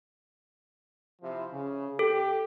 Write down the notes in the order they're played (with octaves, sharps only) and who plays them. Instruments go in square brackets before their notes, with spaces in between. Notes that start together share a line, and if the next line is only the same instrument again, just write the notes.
[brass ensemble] C3 F3 E4
C#3
[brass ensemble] G4 [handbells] A4